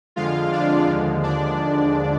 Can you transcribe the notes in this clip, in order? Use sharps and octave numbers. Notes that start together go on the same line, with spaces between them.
F2 D3 F3 G#3 F4 F5
D4 D5
D#2 D3 F3 G#3
D4 D5